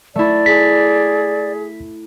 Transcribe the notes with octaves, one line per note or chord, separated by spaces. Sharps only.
A3 E4 D5
G#4 B6